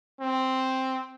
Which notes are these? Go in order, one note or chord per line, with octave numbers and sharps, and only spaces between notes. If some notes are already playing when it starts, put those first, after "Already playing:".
C4